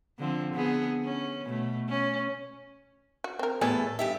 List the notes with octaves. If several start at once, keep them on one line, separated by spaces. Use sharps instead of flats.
D3 F3 C4
D3 B3 G#4
C#4
B2 A3
C#4
F#4
C4 A#4
E2 A2 G3 G#4 A4 B4
G2 G4 E5